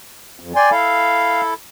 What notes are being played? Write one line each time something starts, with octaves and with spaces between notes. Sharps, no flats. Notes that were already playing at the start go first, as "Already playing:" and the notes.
F2
D5 G5 G#5 C6
E4 A4 F5